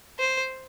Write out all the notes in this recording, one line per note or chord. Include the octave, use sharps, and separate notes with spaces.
C5